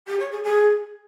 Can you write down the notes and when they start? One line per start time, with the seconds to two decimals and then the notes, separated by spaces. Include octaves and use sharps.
0.07 G4
0.19 C#5
0.31 G#4
0.43 G#4